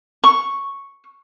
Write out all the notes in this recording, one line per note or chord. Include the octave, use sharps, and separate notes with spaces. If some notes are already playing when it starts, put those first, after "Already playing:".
C#6